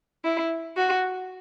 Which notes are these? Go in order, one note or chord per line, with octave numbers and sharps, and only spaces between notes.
E4
F#4